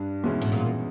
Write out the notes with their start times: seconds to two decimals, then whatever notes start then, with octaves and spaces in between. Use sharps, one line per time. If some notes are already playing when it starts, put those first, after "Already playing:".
Already playing: G2 D4
0.23 E2 B2 G#3 C#4 E4
0.42 A2
0.52 A#2